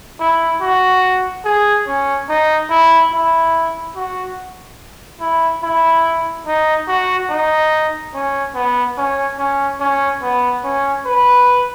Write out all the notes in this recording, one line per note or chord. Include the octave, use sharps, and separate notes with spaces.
E4
F#4
G#4
C#4
D#4
E4
E4
F#4
E4
E4
D#4
F#4
D#4
C#4
B3
C#4
C#4
C#4
B3
C#4
B4